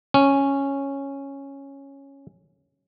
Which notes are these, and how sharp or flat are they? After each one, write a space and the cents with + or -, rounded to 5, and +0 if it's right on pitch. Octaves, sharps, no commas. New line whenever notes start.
C#4 -5